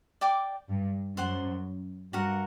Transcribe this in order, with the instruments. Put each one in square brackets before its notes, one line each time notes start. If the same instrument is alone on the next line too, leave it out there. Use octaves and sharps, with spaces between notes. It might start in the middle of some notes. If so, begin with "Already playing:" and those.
[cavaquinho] D5 G5 D6
[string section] G2
[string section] F#2 [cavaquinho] C5 F#5 C6
[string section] G2 [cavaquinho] F#4 A#4 F#5